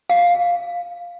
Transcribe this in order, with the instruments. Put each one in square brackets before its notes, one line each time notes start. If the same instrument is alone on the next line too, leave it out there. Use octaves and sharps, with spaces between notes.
[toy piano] F5